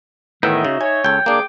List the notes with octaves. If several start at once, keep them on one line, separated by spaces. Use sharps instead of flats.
A2 D#3 E3 B3 D#4 E5
C#3 F#4
C#5 G#5
C#2 A4 G5
A#3 D4 G#4 D6